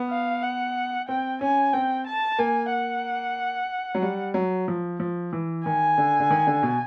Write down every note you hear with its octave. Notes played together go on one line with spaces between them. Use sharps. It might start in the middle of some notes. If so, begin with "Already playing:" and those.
Already playing: B3
F5
F#5
C4 G5
C#4 G#5
C4 G5
A5
A#3 G#5
F#5
F#3
G3
F#3
F3
F3
E3
D#3 G#5
D3
D3
D#3
D3
B2